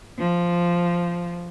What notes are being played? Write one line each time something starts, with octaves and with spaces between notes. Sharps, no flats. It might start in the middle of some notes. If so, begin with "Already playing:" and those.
F3